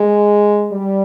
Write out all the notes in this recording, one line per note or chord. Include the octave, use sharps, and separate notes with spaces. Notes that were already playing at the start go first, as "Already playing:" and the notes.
Already playing: G#3
G3